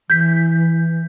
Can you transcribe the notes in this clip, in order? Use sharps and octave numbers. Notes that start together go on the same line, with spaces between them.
E3 G6 B6